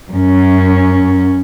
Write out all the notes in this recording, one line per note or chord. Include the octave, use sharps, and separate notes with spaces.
F#2 C#4